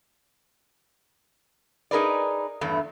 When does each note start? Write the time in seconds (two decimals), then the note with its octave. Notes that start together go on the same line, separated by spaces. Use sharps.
1.91 D#4 G#4 A#4 B4 D5
2.61 E2 G2 A3